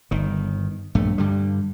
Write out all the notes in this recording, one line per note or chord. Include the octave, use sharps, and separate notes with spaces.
G1 D#3
A#1 G2 A3
G2 D3 G3